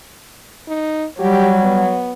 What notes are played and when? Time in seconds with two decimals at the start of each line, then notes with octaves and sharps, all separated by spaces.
0.68 D#4
1.19 F#3 G3 G4
1.63 B3